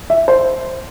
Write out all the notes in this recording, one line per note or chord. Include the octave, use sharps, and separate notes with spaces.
E5
C5